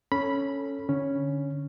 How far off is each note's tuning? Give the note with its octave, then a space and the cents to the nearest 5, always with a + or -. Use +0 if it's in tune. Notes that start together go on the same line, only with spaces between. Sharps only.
C#4 +0 A4 +10 B5 -10
D3 +0 C#4 +0